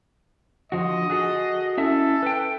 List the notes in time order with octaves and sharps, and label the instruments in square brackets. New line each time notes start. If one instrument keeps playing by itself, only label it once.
[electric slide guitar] D3 F3 F#4 [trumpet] D#5
[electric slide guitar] F#4 G#4 A4
[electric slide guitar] C#4 E4 E5 [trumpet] A4
[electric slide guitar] B4 G5